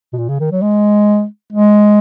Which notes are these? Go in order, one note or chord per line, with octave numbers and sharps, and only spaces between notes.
B2
A#2
C#3
D#3
F#3
G#3
G#3